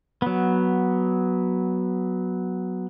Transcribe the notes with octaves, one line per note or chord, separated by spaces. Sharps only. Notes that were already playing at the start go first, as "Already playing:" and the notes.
F#3 B3